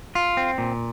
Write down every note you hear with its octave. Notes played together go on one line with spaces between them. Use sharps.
F4
C4
A#2